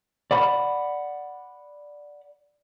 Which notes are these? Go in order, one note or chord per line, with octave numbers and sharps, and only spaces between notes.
D5 F#5 B5